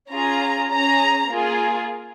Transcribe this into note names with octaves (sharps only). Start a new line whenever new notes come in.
C#4 F4 G#4 A#5
C#4 G#4 A#5
A#3 F4 G#4